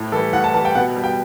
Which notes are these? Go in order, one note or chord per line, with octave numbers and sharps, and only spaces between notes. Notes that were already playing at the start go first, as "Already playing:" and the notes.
Already playing: A2
E3 G3 A4
A2 F#5
A5
E3 G3 A5
G5
B2 F#5
G3
G5